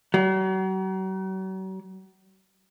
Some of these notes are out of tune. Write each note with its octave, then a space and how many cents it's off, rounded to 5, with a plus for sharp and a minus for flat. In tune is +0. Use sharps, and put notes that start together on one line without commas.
F#3 +40